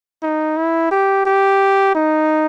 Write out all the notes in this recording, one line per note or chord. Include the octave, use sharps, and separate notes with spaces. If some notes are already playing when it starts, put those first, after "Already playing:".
D#4
E4
G4
G4
D#4